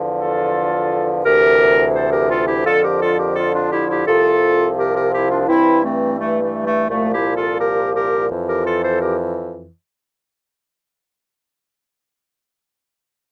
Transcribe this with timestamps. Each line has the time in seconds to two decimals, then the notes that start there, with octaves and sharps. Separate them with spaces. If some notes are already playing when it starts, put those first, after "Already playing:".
Already playing: E2 D3 F3
0.19 F4 A4
1.24 D2 C3 E3 G4 A#4
1.94 A4 C5
2.12 G4 A#4
2.30 F4 A4
2.48 E4 G4
2.65 F2 D3 F3 F4 A4
2.83 G4 A#4
3.01 F4 A4
3.18 G4 A#4
3.36 F4 A4
3.53 D4 F4
3.71 E4 G4
3.89 E4 G4
4.06 C2 C3 F3 F4 A4
4.77 G4 A#4
4.95 G4 A#4
5.12 E4 G4
5.30 D4 F4
5.40 F4
5.47 G2 E3 C4 E4
5.83 A3 C4
6.19 A3
6.41 A3
6.65 A3
6.89 C2 A#2 F3 A3
7.12 E4 G4
7.35 F4 A4
7.59 G4 A#4
7.95 G4 A#4
8.31 F2 E3
8.47 G4 A#4
8.65 F4 A4
8.83 A4 C5
9.00 G4 A#4